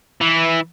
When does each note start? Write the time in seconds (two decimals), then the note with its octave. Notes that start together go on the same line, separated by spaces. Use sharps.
0.21 E3